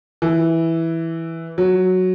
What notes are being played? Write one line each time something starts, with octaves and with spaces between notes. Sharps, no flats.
E3
F#3